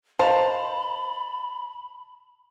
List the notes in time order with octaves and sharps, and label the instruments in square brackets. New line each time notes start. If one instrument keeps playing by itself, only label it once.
[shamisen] C5 [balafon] D#5 F5 [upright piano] A5 F7 [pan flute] B5